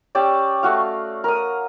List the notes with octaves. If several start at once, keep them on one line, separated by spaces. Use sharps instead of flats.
C#4 G4 D5 E6
A3 F#4 F5
A#4 D#6